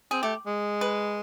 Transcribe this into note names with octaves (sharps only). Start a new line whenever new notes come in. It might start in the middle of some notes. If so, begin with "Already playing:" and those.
C4 G#4
A3 G4
G#3
B4